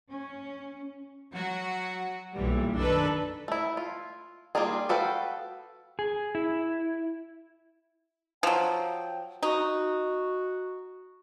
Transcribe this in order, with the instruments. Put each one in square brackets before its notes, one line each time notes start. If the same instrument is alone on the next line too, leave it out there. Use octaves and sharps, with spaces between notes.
[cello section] C#4
[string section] F#3 F#4
B1 A#2 E3 G3
F#2 D#3 D4 A4 B4
[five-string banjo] A3 E4
F4
G3 A#3 D#4 F4 G#4
F#4 A4 B4 F5 G5
[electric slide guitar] G#4
E4
[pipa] F3 F#3 [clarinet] G5
[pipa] D#4 [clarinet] F#4